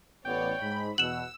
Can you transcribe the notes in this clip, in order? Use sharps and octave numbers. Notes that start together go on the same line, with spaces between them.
A1 B3 C#5 D5 G5
G#2 B5
E2 B2 F#5 E6 E7 F#7